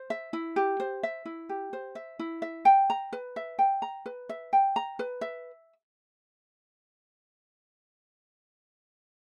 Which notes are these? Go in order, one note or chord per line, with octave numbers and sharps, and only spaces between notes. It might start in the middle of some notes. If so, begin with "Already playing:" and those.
Already playing: C5
E5
E4
G4
C5
E5
E4
G4
C5
E5
E4
E5
G5
A#5
B4
E5
G5
A#5
B4
E5
G5
A#5
B4
E5